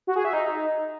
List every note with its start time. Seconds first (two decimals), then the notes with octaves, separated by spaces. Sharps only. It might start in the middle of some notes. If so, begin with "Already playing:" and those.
0.07 F#4
0.16 G#4
0.25 E5
0.33 D#4